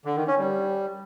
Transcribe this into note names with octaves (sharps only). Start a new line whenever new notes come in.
D3
D#3
C#4
G3